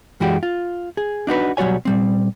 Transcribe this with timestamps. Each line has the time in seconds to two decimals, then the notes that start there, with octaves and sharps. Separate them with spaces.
0.20 F#2 E3 G#3 F#4 G4
0.43 F4
0.97 G#4
1.27 D4 D#4 F#4 B4
1.57 B1 F#3 G3 F#4 C#5 G#5
1.85 A#2 G3 C4